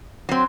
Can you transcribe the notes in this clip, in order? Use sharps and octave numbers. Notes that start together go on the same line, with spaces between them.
F#3 C4